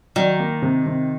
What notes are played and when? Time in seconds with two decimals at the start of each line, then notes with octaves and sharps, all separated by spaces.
0.16 D#3 F#3
0.39 A#3
0.62 C3
0.86 C3